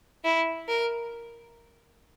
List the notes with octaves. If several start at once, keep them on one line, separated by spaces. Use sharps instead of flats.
E4
A#4